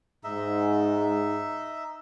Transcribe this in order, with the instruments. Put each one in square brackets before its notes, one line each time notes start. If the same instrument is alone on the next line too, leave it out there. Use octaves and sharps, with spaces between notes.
[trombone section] G#2 [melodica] D#4 E5